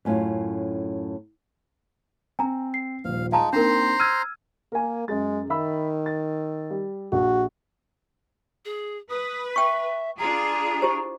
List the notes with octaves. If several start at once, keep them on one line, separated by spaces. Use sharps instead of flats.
F#2 A2 C#4 F4 F#4
C4 G#5 A#5
C7
D#1 A#1 F5
G#3 D#4 F5 A5 A#5
A#3 C4 D4 D#4 A#4 C5 A#5 C6
E6 F6 G#6 D#7
A#3 A#4 G#5
F#2 G#3 G#4 A6
D#3 E5 B5 E6
A6
G3
A#1 F#4
G#4
B4 D#6
E5 G5 C#6
D4 F4 G#4 A#5
E4 G4 C5